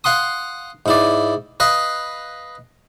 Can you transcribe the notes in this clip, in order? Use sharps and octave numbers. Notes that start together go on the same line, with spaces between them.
F5 F#5 C6 D#6
G#2 E4 D5
B4 D#5 F5